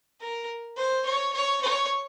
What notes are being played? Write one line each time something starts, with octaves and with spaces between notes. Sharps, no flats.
A#4
C5
C#5
C#5
C#5